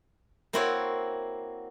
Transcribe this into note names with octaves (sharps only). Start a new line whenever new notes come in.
A#3 C4 E4 F#4 C5 C#5